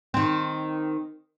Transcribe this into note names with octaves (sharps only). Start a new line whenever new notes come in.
D#3 C4